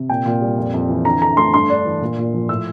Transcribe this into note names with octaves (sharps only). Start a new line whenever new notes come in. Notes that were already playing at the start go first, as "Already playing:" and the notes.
Already playing: C3
A#2 G5
A#2
G3
F2
F2
E3
D3 A#5
D3 A#5
A3 C6
G2 C6
D4
E3
A#2
A#2
F3
A2 E6